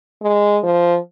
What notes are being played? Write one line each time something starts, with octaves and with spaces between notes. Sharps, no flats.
G#3
F3